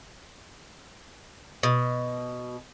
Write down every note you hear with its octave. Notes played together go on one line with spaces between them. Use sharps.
B2